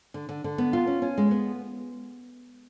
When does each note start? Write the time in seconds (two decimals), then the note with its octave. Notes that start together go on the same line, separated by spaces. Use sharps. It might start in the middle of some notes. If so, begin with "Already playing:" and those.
0.14 D3
0.29 D3
0.44 D3
0.58 B3
0.73 F4
0.87 C#4
1.02 C#4
1.18 G#3
1.31 B3